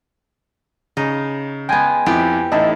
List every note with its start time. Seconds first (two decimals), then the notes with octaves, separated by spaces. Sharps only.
0.97 C#3 D#4
1.69 G#3 B3 G5 G#5
2.06 F2 B3 E4 G4 D7
2.52 A1 A2 D#4 E4 D#5 A5